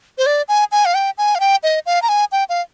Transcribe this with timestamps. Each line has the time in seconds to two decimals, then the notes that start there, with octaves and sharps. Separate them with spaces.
0.18 C5
0.26 D5
0.48 G#5
0.72 G#5
0.85 F5
0.94 G5
1.18 G#5
1.35 F5
1.40 G5
1.63 D#5
1.86 F5
2.02 A#5
2.09 G#5
2.32 G5
2.49 F5